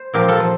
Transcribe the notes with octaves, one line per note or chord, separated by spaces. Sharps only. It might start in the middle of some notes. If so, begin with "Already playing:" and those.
Already playing: C5
A#2 F3 G4 A#4
F4 A4
F3